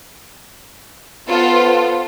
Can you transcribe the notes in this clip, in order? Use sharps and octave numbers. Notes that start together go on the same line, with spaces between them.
B3 F4 A4 C5